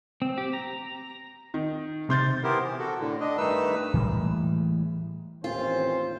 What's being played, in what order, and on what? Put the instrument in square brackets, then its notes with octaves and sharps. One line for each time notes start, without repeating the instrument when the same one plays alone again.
[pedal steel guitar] C4
G4
A#5
[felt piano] D#3
[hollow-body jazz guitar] C3 [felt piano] C6 G6 A6
[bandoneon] B3 E4 G4 A#4 C5
E3
F#4 A4
A2 D3
D4 D#5
G2 D#3 A3 D#4 B4 E6
[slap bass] A2 E3 G3 G#3
[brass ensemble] A1 D#2 C#4 [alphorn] C4 [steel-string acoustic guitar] F4 [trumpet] C5